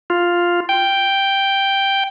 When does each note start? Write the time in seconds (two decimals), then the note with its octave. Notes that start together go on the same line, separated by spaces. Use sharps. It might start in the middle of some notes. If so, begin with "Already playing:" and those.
0.10 F4
0.69 G5